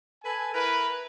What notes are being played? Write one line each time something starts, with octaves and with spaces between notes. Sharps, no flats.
A4 B4 G#5
E4 A#4 B4